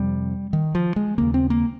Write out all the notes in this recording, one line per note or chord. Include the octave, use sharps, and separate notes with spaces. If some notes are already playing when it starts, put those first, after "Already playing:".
Already playing: F2 C3 G3
D#3
F3
G#3
D#2 C#3 A#3
C4
A#3